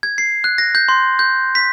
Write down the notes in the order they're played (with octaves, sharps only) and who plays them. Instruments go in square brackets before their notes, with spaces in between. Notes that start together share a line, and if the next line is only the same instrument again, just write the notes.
[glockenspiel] G#6
C7
F#6
A#6
G6
C6
G6
B6